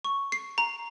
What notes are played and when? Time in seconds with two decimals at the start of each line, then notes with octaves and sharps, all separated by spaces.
0.05 C#6
0.32 C7
0.58 A#5